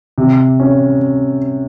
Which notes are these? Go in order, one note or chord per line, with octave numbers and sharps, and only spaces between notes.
C3
C#4